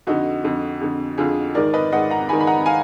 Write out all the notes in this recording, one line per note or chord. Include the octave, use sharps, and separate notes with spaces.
F2 D3 D#4 F#4
F2 D3
F2 D3
F2 D3 F4 G#4
G#2 D#3 A#4 D5
B4 D#5
G#2 D#3 D#5 F#5
F#5 A#5
G#2 D#3 G#5 B5
B5
F#5 A#5
F5 G#5